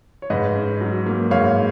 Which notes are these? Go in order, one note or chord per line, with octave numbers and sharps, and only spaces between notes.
C#5
G#2 B4 D#5
C#4
F#3
A#3
G#2 C#5 F5